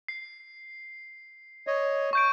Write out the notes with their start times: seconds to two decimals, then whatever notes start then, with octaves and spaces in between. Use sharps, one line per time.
0.08 C7
1.67 C#5 D#5
2.13 C#6 G6 D7